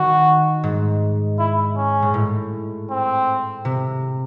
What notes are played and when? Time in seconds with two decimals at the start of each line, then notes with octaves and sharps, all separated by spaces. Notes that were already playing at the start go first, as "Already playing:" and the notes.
Already playing: D#3 F#4
0.63 G#2
1.39 E4
1.77 C#4
2.02 G#2
2.14 A2
2.90 C4
3.65 C3